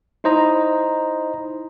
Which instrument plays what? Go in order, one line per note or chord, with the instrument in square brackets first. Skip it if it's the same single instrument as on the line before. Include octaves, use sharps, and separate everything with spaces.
[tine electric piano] D#4 E4 C5 D#5 A#5